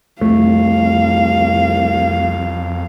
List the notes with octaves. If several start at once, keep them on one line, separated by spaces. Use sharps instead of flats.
C2 F2 A3 F5